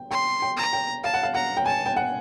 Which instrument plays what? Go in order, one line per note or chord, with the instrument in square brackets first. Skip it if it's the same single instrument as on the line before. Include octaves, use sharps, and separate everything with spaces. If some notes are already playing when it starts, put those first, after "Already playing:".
Already playing: [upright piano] G5
[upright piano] G5 [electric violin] C6
[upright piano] G5
[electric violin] A#5
[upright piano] G5
[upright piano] F5 [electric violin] A5
[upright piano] F#5
F5
[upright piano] F#5 [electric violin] A#5
[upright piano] G5
[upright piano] G#5 [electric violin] A5
[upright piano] G5
F#5